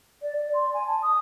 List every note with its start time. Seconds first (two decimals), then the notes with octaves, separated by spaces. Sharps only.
0.22 D5
0.36 D5
0.53 C6
0.73 G#5
0.87 A5
1.02 D#6